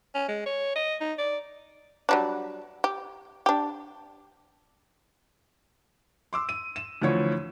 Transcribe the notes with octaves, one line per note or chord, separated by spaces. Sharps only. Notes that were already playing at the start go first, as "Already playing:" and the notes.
C#4
G#3
C#5
D#5
D#4
D5
F#3 G3 D4
G4
D4 G4
C6 D6 E6
D#7
E7
D2 E3 F3 C#5